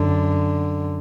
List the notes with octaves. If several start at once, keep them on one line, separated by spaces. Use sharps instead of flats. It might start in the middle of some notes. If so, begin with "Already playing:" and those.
Already playing: F#2 D3